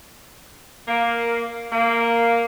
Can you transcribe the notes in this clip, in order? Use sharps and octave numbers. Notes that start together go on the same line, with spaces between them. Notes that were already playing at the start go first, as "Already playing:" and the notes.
A#3
A#3